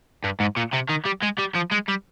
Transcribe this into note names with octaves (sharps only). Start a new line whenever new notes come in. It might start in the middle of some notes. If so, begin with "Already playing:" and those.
G2
G#2
A#2
C3
D#3
G3
G#3
G3
F3
G#3
G3